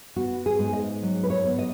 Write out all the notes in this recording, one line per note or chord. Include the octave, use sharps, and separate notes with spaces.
B3 F#4
G#4
G#2
D#5
F#3
B4
C#5
B3
D#5